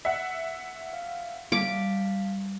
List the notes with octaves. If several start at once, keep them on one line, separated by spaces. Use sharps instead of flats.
E5 F#5
F5
G3 F5 A5 D6 B6